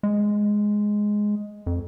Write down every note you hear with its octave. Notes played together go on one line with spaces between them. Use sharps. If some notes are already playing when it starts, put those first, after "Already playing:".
G#3
F2